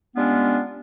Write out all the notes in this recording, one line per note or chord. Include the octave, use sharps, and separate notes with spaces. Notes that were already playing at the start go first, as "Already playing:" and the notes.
G3 G#3 B3 C#4 D4 F4